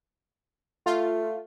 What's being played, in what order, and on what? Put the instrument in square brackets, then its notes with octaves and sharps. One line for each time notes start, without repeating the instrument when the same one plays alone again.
[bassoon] A3 [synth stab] F4